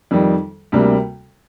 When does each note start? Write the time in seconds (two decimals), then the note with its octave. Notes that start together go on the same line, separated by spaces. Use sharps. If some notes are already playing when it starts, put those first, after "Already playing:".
0.11 F2 D#3 G3
0.72 D2 C3 G3 A#3